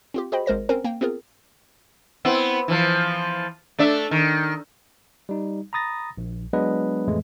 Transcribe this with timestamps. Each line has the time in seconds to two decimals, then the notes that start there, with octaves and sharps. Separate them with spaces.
0.14 C4 F4 G4
0.32 F#4 G#4 C5 D#5 G5 B5
0.46 G#1 G#3 A#4 C5 A#6
0.69 C4 C#4 A#4 C5 G#5
0.84 A#3 G5
1.01 B3 C4 F4 G#4 A#4
2.25 B3 C4 E4
2.68 E3 F3
3.78 A3 D4 E5
4.11 D#3
5.29 G3 D#4
5.73 A#5 B5 D#6 A6 A#6
6.17 A#1
6.53 F#3 G#3 B3 D4 B4 D#5
7.08 F2 A2 E3 G#3 A3